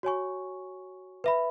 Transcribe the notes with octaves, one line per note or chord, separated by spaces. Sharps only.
F#4 C#5 G#5 C#6
B4 E5 B5